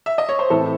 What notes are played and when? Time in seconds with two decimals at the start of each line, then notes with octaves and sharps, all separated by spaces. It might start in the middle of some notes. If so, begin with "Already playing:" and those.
0.06 E5
0.18 D#5
0.29 C#5
0.39 C5
0.50 A2 E3 C4 A4